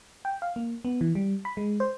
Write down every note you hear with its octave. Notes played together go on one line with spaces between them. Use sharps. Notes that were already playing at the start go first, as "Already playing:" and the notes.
G5
F5
A#3
B3
E3
G3
B5
G#3
C5